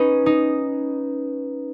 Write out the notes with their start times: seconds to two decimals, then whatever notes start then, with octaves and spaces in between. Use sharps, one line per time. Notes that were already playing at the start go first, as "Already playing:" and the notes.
Already playing: C#4 D#4 B4
0.26 D#4